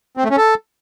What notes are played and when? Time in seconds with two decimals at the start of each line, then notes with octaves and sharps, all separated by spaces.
0.17 C4
0.24 A3
0.31 C#4
0.37 A4